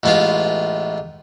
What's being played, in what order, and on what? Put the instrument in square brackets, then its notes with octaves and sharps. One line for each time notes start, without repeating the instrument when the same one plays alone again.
[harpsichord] A1 A2 G#3 B3 F4